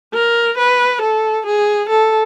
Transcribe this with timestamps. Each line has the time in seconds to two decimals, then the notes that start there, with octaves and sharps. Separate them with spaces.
0.14 A#4
0.58 B4
1.02 A4
1.46 G#4
1.89 A4